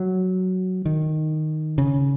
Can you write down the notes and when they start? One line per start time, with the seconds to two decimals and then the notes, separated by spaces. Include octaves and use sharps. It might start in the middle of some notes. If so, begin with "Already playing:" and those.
Already playing: F#3
0.85 D#3
1.78 C#3